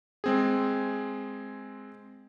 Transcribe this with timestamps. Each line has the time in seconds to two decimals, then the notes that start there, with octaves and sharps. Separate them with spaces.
0.24 G#3 C4 G#4